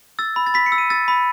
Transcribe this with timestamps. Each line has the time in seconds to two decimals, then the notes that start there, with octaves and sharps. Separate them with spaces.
0.19 E6 A6
0.36 B5
0.47 A6
0.54 B5 B6
0.66 C#7
0.72 E6
0.78 D#7
0.90 E6 A6
1.08 B5